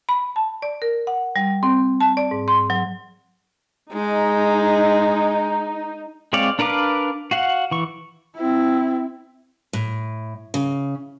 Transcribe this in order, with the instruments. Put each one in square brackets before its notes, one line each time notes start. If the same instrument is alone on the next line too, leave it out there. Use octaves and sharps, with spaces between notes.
[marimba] B5
A5
D5
A#4
F#5
G3
C4
A5
D5
G#2
C6
F#3
[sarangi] G#3 [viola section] D#4
[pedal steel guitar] G#3 C4 C#5 D5 F5
D4 A#4 B4 F5 D6
F#4 F5 F#5
E3 C#6
[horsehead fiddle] C4 E4
[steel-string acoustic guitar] A2
C#3